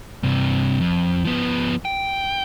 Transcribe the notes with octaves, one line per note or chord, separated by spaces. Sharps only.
G2 C3
F2
F3 B3
G5